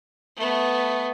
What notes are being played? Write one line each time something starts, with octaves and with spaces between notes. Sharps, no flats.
A3 B3